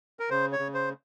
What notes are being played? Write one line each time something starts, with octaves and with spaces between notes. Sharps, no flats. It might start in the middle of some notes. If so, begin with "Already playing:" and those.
A#4
C#3 C5
C#5
C#3
C5